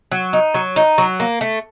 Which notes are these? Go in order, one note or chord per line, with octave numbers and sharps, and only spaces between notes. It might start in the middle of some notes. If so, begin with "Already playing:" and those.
F#3
D#4
F#3
D#4
F#3
A#3
A3